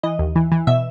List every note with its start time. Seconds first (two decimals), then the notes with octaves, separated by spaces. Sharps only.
0.03 E3 D#5
0.19 D#2
0.35 E3
0.52 E3
0.67 B2 E5